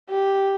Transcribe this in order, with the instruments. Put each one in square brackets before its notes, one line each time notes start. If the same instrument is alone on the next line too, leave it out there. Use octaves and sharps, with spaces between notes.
[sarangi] G4